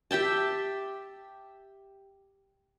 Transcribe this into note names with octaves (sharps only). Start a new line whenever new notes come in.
G4 E5 G5 A5